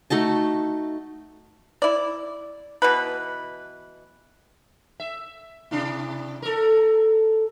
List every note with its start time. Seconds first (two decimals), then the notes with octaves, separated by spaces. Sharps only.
0.10 A3 D#4 F#4 A5
1.82 E4 D5
2.82 B2 E3 B4
5.00 E5
5.71 C3 D4 E4
6.42 A4 A#4